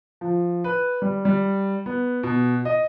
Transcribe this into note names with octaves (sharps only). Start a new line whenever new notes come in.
F3
B4
G3
G3
B3
B2
D#5